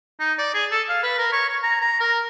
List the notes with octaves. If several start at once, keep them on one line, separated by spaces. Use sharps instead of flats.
D#4
D5
G#4
A4
F5
B4
A#4
C#5
C#5
A#5
A#5
A#4